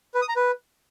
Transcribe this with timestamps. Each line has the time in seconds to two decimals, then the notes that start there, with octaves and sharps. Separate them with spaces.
0.14 B4
0.22 D#6
0.29 A#5
0.36 B4